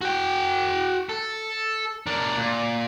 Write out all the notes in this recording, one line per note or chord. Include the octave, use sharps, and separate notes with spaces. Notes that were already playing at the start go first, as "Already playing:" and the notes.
F#4 G5
A4
D4 A#4
A#2